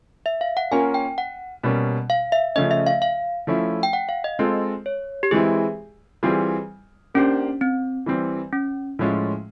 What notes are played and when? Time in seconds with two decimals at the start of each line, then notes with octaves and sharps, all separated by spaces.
0.26 E5
0.41 F5
0.57 F#5
0.71 A#3 C#4 F4 A#4 G#5
0.94 G5
1.18 F#5
1.63 B2 G3 A#3 C#4
2.10 F5
2.32 E5
2.56 C#3 F3 A3 C#4 D#5
2.71 E5
2.86 F5
3.02 F5
3.47 F3 A3 C#4 E4
3.83 G5
3.93 F#5
4.09 F5
4.24 D#5
4.39 G#3 C4 F4 A4
4.86 C#5
5.23 G4
5.31 E3 G#3 C4 E4 G#4
6.23 E3 G3 C4 F4 G#4
7.14 A#3 C#4 D4 G4 C5
7.61 C4
8.06 E3 G3 C4
8.53 C#4
8.99 A2 F3 G#3 C#4 F4